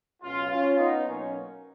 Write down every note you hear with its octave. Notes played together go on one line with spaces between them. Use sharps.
C#2 B2 F#3 C#4 F4
C#4 F4
B3 D#4
B1 B2 F#3 A#3 C#4